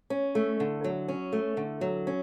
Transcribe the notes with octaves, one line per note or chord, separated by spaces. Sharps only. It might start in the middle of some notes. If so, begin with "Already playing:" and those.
C#4
A3
D3
F#3
C#4
A3
D3
F#3
C#4